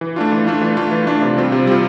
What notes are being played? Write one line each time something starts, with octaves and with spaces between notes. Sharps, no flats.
E3
A3 D4 F4
E3
A3 D4 F4
E3
A3 D4 F4
E3
A3 D4 F4
C3
G3 C4 F4
C3
G3 C4 F4